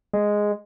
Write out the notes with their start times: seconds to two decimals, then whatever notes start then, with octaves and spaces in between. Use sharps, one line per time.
0.13 G#3